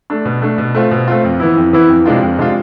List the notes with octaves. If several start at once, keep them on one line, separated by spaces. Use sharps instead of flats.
A3 D4
B2
A3 D4
B2
A3 C4 F4
B2
A3 C4 F4
F2
E3 B3 E4
F2
E3 B3 E4
F2
C3 G#3 D4 F4
F2
C3 G#3 D4 F4